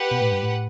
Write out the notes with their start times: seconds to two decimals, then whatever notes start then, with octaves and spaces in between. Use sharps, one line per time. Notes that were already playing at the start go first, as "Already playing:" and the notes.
Already playing: G4 B4 F#5
0.11 B2
0.21 A2
0.32 G2
0.42 A2